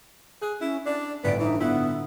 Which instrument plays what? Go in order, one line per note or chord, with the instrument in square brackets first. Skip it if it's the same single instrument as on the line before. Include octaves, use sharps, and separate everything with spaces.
[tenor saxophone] G#4 [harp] F#6
[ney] C#4 [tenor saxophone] E4
[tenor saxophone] D4 [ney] D5
[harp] G1 A2 D7 [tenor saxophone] B3 [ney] D5
[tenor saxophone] E3 [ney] D#4
[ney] B3 [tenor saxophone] E4 [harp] F4 F#5